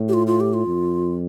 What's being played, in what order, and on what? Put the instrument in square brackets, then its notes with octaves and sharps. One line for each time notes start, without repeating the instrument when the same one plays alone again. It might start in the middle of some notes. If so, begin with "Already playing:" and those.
Already playing: [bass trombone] A2
[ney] G4
F4
F4
G4
F4
[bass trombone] F2